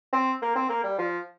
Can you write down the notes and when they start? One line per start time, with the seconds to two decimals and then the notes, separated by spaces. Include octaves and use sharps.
0.13 C4
0.42 A#3
0.55 C4
0.69 A#3
0.83 G3
0.99 F3